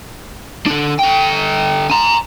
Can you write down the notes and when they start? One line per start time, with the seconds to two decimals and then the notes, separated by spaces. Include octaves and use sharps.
0.66 D3 D4
0.99 D3 G5
1.90 G#5 A#5